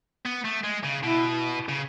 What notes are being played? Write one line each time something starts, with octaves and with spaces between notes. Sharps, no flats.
B3
A3
G#3
C#3
B2 E4
C#3